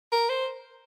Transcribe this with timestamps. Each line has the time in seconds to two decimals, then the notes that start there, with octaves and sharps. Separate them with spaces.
0.12 A#4
0.29 C5